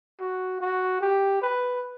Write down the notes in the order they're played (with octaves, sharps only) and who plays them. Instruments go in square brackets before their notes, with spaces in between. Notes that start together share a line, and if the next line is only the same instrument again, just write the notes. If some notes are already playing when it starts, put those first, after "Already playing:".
[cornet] F#4
F#4
G4
B4